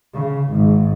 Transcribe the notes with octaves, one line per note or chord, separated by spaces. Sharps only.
C#3
G#1 G#2